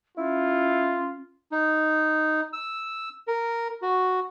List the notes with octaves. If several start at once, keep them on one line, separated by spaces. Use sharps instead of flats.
C#4 E4 F4
D#4
E6
A#4
F#4